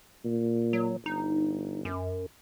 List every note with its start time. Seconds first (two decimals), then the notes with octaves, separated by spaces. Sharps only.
0.24 A#2
0.73 F#3
1.06 G1 D#4
1.85 F#2